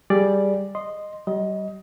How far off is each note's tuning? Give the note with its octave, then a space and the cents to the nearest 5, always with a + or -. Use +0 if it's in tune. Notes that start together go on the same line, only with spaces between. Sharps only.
G3 +0 G#4 +0 D5 +5
D#5 -10 C6 +0
G3 -35 D#5 +20